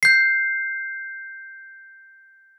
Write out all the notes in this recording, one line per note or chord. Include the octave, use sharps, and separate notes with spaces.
G6 C7